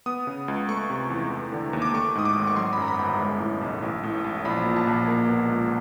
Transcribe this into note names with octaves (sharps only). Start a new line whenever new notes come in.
B3 D#6
C#3
C#2
A3 C#6
C3
E2
A3
D3
D#2
D6
A3 C#6
G#2 D#6
D6
G#1
C#6
F#3 C6
B5
F#2 A#5
B5
G1
G#3
A2
B1
A1
A2
A1
A#1 B5
A#2
A5
A#1
A#3
B2
C#2